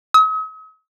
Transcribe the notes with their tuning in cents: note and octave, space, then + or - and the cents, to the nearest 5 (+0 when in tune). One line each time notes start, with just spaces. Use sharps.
D#6 +45